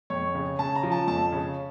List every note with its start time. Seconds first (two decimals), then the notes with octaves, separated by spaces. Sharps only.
0.10 F2 C#5
0.35 C#3
0.59 C#3 A5
0.75 A#5
0.83 F3
0.92 A5
1.08 F2 A5
1.32 C#3